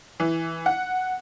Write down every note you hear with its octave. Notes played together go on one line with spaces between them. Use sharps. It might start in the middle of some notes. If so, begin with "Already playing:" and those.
E3
F#5